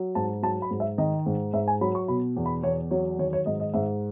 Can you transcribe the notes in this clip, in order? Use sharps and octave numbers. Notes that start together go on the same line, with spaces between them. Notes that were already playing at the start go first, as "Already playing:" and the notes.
Already playing: F#3
G#2 A5
F#3 A5
B5
G#2
E5
D#3 D#5
G#2
G#2 E5
G#5
F#3 B5
C#6
B2 B5
E2
B5
E2 C#5
F#3 C#5
D#3 C#5
C#5
G#2 D#5
D#5
G#2 E5